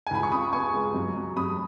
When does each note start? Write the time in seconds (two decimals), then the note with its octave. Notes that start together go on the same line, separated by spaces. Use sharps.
0.07 G#5
0.11 C#2 B5
0.23 C#6
0.32 C#3 B5 D#6
0.53 B3 G#5 C#6
0.74 G#3
0.94 F#2
1.16 F#3
1.36 F#2 B5 D#6